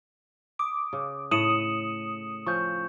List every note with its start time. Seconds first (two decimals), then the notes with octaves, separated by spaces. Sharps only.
0.59 D6 D#6
0.93 C#3
1.31 A2 D#6 C#7 E7 F#7
2.47 F3 C#4 C#6 G6